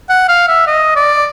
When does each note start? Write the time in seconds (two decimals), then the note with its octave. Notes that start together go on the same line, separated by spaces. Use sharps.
0.09 F#5
0.28 F5
0.48 E5
0.67 D#5
0.96 D5